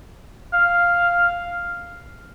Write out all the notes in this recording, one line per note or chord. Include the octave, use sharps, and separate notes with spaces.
F5